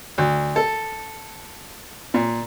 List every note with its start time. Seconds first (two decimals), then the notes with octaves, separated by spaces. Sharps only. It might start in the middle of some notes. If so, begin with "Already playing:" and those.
0.18 D2
0.56 A4
2.14 A#2